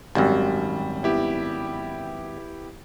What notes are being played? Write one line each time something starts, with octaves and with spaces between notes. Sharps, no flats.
G#1 F#2 G3
B3 E4 G4